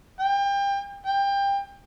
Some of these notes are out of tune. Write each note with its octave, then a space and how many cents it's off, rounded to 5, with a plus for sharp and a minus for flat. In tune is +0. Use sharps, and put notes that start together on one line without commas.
G5 +30
G5 +25